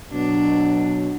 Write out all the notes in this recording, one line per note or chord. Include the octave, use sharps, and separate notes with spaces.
B2 F#3 D4